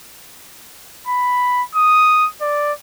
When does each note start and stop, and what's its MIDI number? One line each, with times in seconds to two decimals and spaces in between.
1.07 1.63 83
1.75 2.27 87
2.41 2.73 74